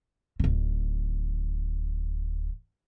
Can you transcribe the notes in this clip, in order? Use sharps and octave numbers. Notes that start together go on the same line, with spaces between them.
D1 D#3